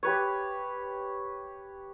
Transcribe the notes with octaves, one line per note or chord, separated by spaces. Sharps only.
G4 B4 C#5